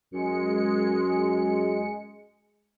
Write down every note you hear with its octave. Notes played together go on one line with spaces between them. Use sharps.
F#2 G#3 C#7